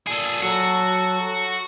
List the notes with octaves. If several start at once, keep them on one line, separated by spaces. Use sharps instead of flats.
A#2 G#4 A4
F#3 F#4 A4